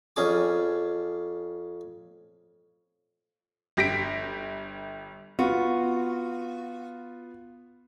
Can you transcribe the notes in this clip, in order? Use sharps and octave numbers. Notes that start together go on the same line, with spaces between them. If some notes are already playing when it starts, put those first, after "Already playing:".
F2 C#4 G#4 D6
G1 G4 A#6 B6 D7
B3 F4 F#4